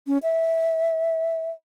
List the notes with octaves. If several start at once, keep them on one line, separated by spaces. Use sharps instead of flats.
C#4
E5